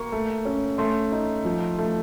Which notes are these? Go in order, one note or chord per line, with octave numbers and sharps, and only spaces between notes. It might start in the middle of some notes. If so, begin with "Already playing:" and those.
Already playing: A#3 C#6
A3
C#4
A3 C6
D#4
F3
A3